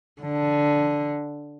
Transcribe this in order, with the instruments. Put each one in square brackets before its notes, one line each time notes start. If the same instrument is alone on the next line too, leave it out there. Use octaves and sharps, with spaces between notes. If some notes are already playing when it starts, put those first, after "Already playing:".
[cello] D3